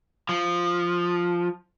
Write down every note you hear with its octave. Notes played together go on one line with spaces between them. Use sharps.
F3